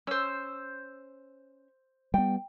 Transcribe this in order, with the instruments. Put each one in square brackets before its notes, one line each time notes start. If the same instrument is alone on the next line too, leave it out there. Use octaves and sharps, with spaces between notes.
[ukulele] C#4 [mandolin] C5 E6
[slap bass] G3 B3 [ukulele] G5